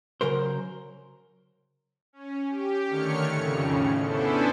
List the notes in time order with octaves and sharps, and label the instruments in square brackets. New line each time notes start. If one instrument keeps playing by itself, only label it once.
[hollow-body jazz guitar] C#3 F#3 A#4 C5
[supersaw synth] C#4
G4
D3 D#3 A3 C#5 F6 C#7
F2 A2 C#3
B3 C#4 D4 E4 A4 C5